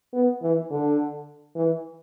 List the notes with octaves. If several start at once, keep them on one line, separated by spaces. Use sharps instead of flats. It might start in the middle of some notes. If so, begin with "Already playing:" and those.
B3
E3
D3
E3